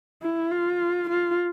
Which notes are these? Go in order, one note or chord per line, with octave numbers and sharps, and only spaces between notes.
E4
F4
F4